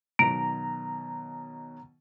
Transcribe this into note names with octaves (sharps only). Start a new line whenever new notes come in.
B2 D#3 F#3 A#5 D7